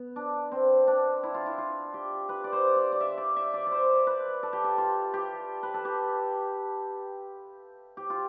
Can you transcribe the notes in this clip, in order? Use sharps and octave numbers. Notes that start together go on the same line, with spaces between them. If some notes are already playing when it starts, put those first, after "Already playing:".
Already playing: B3
D4
C4
D4
E4
F4
E4
F4
G4
B4
D5
C5
D5
D5
E5
D5
E5
D5
D5
C5
B4
A4
G4
A4
F4
G4
B4
A4
G4
G4
F4